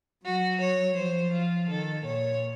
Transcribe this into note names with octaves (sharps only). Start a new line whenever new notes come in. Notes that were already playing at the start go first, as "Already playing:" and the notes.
F#3 F#4
C#5
F3 C5
F4
D#3 A4
A#2 C#5